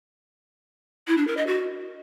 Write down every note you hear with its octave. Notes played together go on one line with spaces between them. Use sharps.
E4
D4
A#4
D#5
F#4